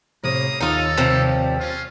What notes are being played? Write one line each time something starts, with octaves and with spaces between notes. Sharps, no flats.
A2 C3 A#3 A#5 D#6
D#2 D#4 F4 A4
C3 F3 G3
C#4 F4